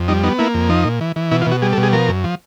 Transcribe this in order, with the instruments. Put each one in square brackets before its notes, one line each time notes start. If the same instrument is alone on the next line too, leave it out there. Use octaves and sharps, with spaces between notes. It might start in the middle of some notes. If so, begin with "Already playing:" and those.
Already playing: [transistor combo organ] F2
G3 D#4
B3 D#4
A#3 E4
F2
F3 D#4
A#2
E3
E3
B2 E4
F4
B2 F#4
G3 G#4
A4
B2
G#4
F3 A#4
F#2
F3